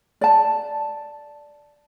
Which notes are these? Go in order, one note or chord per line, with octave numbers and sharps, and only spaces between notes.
D5 A5